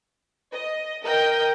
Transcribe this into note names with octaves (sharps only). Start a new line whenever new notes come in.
D#5
A#4 D#5 G5 G6